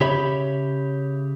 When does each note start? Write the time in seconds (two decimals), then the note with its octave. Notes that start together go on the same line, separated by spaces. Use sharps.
0.01 C#3 G4 C#5 E5 B5